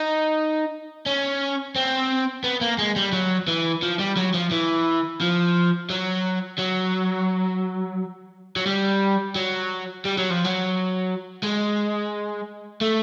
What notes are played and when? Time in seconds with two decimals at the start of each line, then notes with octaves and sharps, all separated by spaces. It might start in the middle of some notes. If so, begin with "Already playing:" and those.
Already playing: D#4
1.06 C#4
1.76 C4
2.44 B3
2.61 A#3
2.78 G#3
2.96 G3
3.13 F#3
3.48 E3
3.83 F3
4.00 G3
4.17 F#3
4.34 F3
4.51 E3
5.21 F3
5.90 F#3
6.59 F#3
8.56 F#3
8.66 G3
9.36 F#3
10.05 G3
10.17 F#3
10.30 F3
10.44 F#3
11.43 G#3
12.81 A3